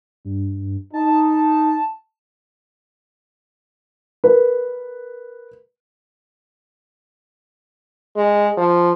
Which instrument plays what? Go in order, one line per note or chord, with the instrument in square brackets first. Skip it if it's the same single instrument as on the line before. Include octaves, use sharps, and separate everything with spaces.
[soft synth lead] G2
[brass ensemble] D#4 [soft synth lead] A5
[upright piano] A#4 B4
[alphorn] G#3
F3